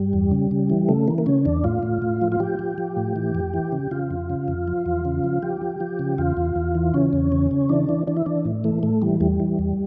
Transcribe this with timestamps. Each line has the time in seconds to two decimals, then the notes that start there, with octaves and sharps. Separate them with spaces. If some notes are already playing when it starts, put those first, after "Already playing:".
Already playing: G2 G3
0.13 E2
0.31 C#3
0.51 C#3
0.70 E3
0.89 C#3 A3
1.08 E3 A#3
1.18 A#3
1.26 C#3 C#4
1.45 E2 D4
1.64 A2 F4
1.83 A2
2.02 A2
2.22 F3
2.32 F4
2.40 F3 G4
2.59 F3
2.78 F3
2.97 A2
3.16 E3
3.35 F2
3.54 E3
3.72 C#3
3.91 C#3 F4
4.11 F2
4.30 C#3
4.48 F2
4.68 F3
4.86 E2
5.05 C#3
5.24 F3
5.42 F3 G4
5.61 F3
5.80 F3
5.99 C#3
6.18 E2 F4
6.37 E2
6.56 E2
6.75 E3
6.94 C#3 C#4
7.13 E2
7.32 C#3
7.51 C#3
7.69 E3 D4
7.89 E3
8.07 E3 D4
8.17 E4
8.26 E3 D4
8.45 A2
8.64 E3 A3
8.83 A2 A3
9.02 E3 G3
9.21 E2 G3
9.40 E3
9.59 E2